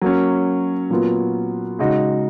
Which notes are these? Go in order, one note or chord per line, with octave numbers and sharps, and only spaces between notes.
F#3 A#3 C#4
A#2 F#3 B3 F4
C#3 G#3 D#4 F#4